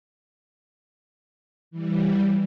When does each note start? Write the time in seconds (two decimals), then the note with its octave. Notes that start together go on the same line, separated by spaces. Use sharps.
1.71 E3 G3